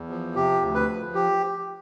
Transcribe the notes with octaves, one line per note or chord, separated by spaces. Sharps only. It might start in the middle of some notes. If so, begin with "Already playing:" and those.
Already playing: E2
F3
C3 G4
D2
B4
F3
G4